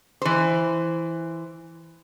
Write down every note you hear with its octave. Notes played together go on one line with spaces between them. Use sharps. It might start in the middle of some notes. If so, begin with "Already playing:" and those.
E3 C5